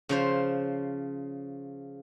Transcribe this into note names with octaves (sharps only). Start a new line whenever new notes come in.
C#3 F3 C5